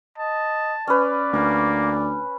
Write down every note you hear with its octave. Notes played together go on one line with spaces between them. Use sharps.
D#5 A5
C#4 B4 D5
D2 A#3